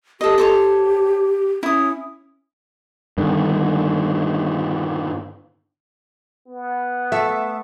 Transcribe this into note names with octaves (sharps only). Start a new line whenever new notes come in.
G4 A4 D#5
A4 C5 C#5
C#4 E4 D#6
G2 D3 D#3
B3
A3 E5